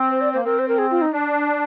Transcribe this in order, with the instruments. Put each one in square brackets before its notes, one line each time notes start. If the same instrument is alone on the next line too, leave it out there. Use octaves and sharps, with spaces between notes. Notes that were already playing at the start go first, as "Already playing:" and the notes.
Already playing: [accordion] C4
[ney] C5
D5
[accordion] A#3 [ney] C5
[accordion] C4 [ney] A#4
[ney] C5
A#4
G#4
F4
D#4
[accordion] D4